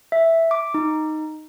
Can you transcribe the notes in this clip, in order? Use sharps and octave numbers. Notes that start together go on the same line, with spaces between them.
E5
D6
D#4